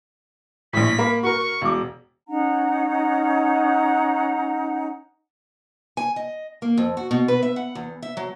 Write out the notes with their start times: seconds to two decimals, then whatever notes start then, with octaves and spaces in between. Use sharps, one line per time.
0.73 A#1 A2 B6
0.98 A#3 A#4 B5
1.23 F#4 A#4 C#6
1.61 E1 D6
2.28 C#4 D#4 F#5 A#5
5.97 G#5
6.16 D#5
6.62 A#3
6.77 F2
6.97 F#4
7.11 B2
7.28 B4
7.43 E5
7.56 F#5
7.75 E2
8.02 E5
8.17 F#3